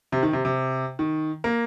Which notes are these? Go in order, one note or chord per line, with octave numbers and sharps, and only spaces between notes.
C3
D#3
C3
C3
D#3
A#3